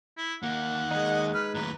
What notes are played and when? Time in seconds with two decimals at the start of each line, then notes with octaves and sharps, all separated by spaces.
0.17 E4
0.43 D#2 A#3 F#5
0.91 G#3 D#4 D#5
1.34 B4 F6
1.55 D#2 A2 B4 A#5